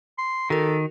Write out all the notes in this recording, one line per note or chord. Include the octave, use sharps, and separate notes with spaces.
C6
D#3 F#4 A4 A#4